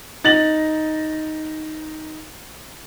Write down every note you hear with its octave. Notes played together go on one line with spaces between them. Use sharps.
D#4 A6 A#6 F#7